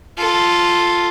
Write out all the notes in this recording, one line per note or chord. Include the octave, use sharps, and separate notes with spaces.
F4 A4